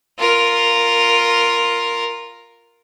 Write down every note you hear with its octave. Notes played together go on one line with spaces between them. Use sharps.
F4 A#4